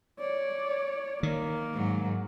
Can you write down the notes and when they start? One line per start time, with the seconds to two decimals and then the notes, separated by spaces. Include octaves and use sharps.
0.19 C#5 D5
1.23 D#3 A#3
1.74 G#2 F#3